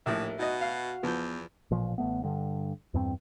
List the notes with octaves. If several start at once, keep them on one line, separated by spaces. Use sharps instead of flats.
A#1 D#2 A2 E3 E5
B2 D#4 F#4 D#5
F5
E2 F3 B3 G6
A1 A#2 F3
A1 F#3 A3 B3
G2 D3
E2 G2 C4